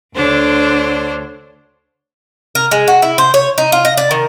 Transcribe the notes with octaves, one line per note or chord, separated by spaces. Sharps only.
D2 D3 D4 C5 C#5
A#4
G#3
F#4
E4
C5
C#5
D#4
F4
D#5
D5
D#3